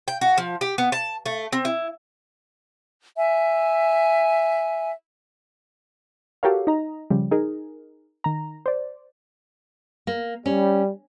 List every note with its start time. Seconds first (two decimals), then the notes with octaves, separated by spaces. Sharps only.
0.08 G5
0.21 F#4
0.38 F3
0.61 G4
0.78 B3
0.92 A5
1.26 A3
1.53 C4
1.65 E4
3.17 E5 G#5
6.43 F#4 G4 A4 A#4 C#5 F5
6.67 D#4 D#5 A#5
7.10 C#3 F3 G3
7.31 D#4 G#4 A#4
8.24 D#3 A#5
8.66 C5 D5
10.07 A#3
10.46 G3 C#4